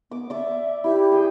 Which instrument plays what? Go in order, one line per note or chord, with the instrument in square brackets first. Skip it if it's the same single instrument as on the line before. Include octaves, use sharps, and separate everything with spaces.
[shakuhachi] B3 [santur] D6
[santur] D5 D6 [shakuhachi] E5
[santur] E4 [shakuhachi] G4
[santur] G#4 G5